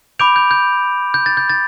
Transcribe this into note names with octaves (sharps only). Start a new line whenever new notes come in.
B5 D6 G6 D7 F7
G6
G6
G6
A6
G6
A6